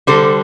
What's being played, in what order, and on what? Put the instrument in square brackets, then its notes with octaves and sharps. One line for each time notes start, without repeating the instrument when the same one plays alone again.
[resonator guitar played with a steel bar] D3 G3 A4 C5